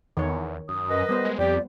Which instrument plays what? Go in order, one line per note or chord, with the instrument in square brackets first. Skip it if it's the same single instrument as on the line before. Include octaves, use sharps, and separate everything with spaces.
[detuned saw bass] E2 [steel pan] D#3 C#5
[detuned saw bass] F#2 [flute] D#6
[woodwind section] A#4 B4 D#5
[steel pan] G3 B3 C5
[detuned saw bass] G#3
[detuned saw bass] F2 [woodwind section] G4 [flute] D5